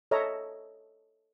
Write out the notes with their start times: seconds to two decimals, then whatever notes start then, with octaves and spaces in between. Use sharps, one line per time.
0.11 A4 C#5 D#5 E5 A#5